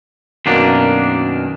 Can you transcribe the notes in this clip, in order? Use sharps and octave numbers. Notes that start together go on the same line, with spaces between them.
F#2 B2 D#3 A#3 D4